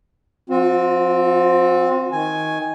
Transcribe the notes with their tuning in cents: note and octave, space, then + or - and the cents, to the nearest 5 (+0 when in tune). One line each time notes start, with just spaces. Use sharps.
F3 +0 C4 +5 F#4 -45
D#3 +20 G#5 +0